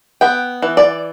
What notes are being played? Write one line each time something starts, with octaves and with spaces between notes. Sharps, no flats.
B3 G5
E3
D5